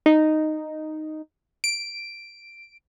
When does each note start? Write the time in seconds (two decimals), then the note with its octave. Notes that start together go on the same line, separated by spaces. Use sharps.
0.06 D#4
1.64 D7